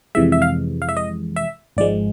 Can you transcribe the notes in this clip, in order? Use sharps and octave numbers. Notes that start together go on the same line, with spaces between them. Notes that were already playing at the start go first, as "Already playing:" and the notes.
F2 C3 E3 G#3 E5
E5
F5
F5
E5
D#5
E5
G#1 G#2 F3 G#3 D5